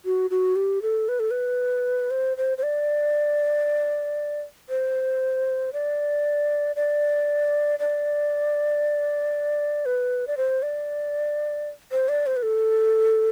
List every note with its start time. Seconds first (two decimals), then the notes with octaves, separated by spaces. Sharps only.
0.05 F#4
0.30 F#4
0.56 G4
0.82 A4
1.09 B4
1.20 A4
1.31 B4
2.11 C5
2.37 C5
2.58 C5
2.63 D5
4.69 C5
5.73 D5
6.76 D5
7.79 D5
9.86 B4
10.27 D5
10.37 C5
10.63 D5
11.92 C5
12.09 D5
12.26 C5
12.36 B4
12.43 A4